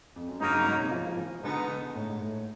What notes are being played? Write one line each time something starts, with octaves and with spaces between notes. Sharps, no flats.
F2
F#2
G2 C#3 F#3 A#3 D#4
F#2
G#2
C3
F3
F3
E3
B2 D3 G#3 B3 D#4
D3
A2
G#2
A2